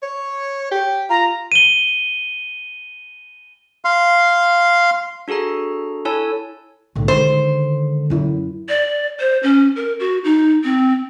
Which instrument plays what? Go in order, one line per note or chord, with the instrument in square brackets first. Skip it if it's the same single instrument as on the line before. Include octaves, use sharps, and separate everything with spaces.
[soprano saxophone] C#5
G4
[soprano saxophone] F4 [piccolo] A#5
[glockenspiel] D#7 G7
[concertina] F5 C6
[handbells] D4 F#4 G#4 A4 A#5
E4 A4 C#5 G#5 A5 E6
[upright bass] B1 A2 [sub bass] D3
[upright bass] D#3 G#3 [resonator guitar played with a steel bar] C5
[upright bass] F#2 E4
[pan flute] D5
C5
C#4
A#4
F#4
D#4
C4